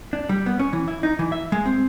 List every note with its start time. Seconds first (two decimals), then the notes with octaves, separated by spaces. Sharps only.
0.13 D4
0.29 G3
0.46 B3
0.59 C#4
0.73 E3
0.88 E4
1.03 D#4
1.19 E3
1.32 E5
1.52 G#3
1.65 C4